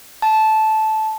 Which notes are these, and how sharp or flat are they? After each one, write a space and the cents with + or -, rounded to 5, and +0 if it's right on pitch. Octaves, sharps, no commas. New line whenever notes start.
A5 -10